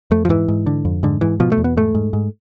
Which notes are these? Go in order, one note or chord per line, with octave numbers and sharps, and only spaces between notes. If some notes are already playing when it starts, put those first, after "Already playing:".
F2 A3
F3
G#2 E3
G#2
D3
F2
G#2 D3
G#2 E3
B2 F3
A3
E2
B3
G#2 A3
G#2
G#2